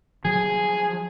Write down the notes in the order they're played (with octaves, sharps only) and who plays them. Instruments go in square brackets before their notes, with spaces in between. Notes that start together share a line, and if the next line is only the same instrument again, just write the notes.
[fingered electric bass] F3 F#3 [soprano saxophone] G#4